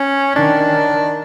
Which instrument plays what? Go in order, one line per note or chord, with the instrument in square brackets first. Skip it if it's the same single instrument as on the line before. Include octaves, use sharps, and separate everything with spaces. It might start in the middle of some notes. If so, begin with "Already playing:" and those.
Already playing: [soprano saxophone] C#4
[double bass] D#3 [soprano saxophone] D4